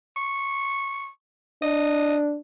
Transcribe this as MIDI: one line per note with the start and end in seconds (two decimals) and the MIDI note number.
0.16 1.08 85
1.62 2.38 62
1.62 2.16 75